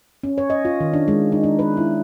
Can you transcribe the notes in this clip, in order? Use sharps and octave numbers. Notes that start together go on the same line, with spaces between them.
C#4
C#5
D#5
F4
D#3
D4
G#3
D#4
D4
B4
E4